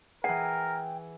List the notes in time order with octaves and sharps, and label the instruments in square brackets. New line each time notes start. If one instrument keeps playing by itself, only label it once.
[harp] E3 G#4 [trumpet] A#4 [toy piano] F#5 [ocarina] G5